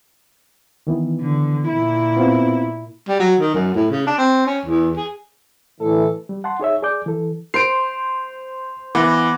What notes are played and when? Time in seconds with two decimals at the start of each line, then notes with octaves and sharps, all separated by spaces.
0.87 D#3 E3 B3
1.21 D3
1.68 A#2 E4
2.17 B3 C4 F4
3.08 G3
3.20 F#3
3.40 D#3
3.55 F#2
3.75 A2
3.91 C#3
4.07 D4
4.18 C4
4.47 C#4
4.65 E2
4.96 G#4
5.80 A2 D3 E3 A4
6.29 G3
6.44 F#5 A5 C6
6.60 D#4 G#4 C#5 E5
6.83 G#4 D5 G#5 D6 G6
7.06 E3 A4
7.54 C5 C7 D7 F7
8.95 E3 B3 D6 F#6 A#6